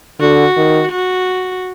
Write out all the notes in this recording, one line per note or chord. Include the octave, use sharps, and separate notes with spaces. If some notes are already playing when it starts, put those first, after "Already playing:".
D3 F#4
D#3
F#4